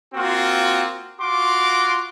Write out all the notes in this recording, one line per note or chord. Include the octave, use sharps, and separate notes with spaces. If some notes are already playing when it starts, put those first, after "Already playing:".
A#3 C4 F4 F#4
F4 F#4 C6 D6